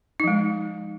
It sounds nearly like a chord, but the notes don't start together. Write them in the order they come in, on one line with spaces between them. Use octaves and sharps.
D#4 F3 G#3